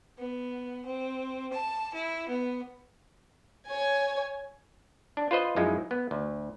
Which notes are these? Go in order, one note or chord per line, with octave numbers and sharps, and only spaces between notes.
B3
C4
A5
E4
B3
C#5 G#5
D4
F4 B4 C5 D#5
F#2 F3 G#3 D#4 E4
B3
D2